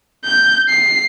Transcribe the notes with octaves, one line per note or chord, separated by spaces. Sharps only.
G6
C7